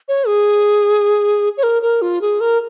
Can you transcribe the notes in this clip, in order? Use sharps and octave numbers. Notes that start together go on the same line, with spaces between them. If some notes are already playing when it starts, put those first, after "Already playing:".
C#5
G#4
C#5
A#4
A#4
F4
G#4
A#4